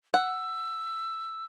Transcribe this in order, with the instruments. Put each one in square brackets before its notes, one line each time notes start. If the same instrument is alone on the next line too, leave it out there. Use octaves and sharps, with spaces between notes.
[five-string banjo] F#5 [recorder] E6